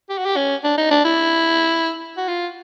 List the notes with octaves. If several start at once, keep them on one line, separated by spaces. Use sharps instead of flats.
G4
F#4
G4
C#4
D4
D#4
D4
E4
F#4
F4